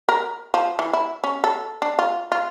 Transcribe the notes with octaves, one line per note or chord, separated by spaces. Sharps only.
A#4
F3
E3
E4
C#4
A4
D4
F4
F4